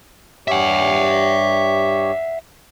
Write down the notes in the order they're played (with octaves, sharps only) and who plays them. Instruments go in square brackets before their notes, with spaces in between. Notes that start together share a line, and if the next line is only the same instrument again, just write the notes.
[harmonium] G2 G4 C#5 [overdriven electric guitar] E5 F#5